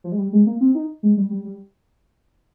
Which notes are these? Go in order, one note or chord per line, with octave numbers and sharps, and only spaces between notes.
F3
G#3
G3
G#3
A#3
C4
D#4
G#3
G3
G3
G3